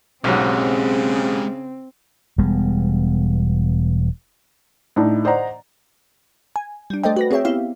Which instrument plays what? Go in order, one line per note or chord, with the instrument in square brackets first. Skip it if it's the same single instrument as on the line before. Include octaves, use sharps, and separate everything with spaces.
[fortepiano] B1 G#2 F#3 [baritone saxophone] C#3 [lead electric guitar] G#3 G4 [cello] C4
[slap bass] E1 G3 G#3 B3
[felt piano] A2 D4 D#4
C5 D5 D#5 F#5 A#5
[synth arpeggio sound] G#5
G3 D4
A3 A4 C5 D5 D#5 G5
F#4 B4 A#6
C4 G#4 C#5 E5 G5
B3 C4 E4 G4 E5 F5